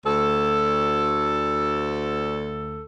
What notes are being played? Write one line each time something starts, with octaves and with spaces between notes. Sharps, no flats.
D2 A4